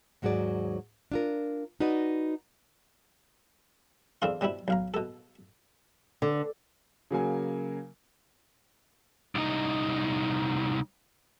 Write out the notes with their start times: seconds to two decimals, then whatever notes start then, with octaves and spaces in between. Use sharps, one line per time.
0.22 D#2 G#2 F#3 F#4 G#4 D5
1.12 D4 F4 A#4
1.80 D#4 F#4 B4 D5 D#5
4.22 E2 C4 D4 A4 F5 C6
4.41 B2 G3 C4 E4
4.68 B1 F5 A#5
4.94 B2 A4
6.22 D3
7.11 C#3 F#3 A#3 G#5
9.35 C2 D#4